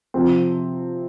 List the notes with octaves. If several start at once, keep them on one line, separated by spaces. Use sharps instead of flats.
C3 F3 C4